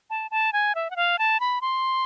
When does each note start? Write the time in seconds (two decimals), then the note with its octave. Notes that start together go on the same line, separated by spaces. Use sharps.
0.10 A5
0.31 A5
0.53 G#5
0.75 E5
0.91 F#5
0.96 F5
1.19 A5
1.40 B5
1.61 C6